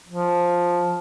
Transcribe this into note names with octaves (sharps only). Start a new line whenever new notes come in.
F3